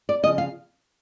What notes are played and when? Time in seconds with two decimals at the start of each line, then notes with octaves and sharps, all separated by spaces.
0.09 D5
0.23 C#3 F3 D#5
0.38 F5